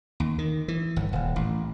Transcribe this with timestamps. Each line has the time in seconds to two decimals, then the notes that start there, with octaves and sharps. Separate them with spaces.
0.20 D#2
0.38 D#3
0.68 E3
0.96 G1
1.13 D#1
1.36 A1